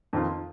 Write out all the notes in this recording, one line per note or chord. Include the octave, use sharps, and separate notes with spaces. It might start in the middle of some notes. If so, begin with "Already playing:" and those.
F2 D#3 C4 F4